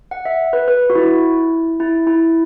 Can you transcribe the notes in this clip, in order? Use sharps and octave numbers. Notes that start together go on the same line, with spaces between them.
F#5
E5
B4
B4
F#4
E4
E4
E4